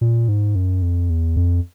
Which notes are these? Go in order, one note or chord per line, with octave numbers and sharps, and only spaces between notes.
A#2
G#2
F#2
F2
E2
F2